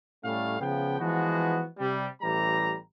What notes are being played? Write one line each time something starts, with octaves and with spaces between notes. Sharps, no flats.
A2 G3 A3 C#4 F5
C#3 F3 B3 G5
E3 F3 G#3 B3 F#4
C3 G3
A1 E3 G3 A#5